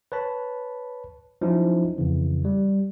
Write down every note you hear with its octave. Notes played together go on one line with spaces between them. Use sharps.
B4 C#5 A5 B5
F3 F#3 C#4 D#4 E4
F2 C#3 E3
G3